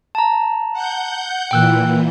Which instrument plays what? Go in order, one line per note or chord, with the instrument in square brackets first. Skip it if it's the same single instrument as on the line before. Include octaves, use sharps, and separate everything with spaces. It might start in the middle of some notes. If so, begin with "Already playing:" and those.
[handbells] A5 A#5
[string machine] F#5 G6
[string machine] A#2 E3 [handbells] G5 E6 F#6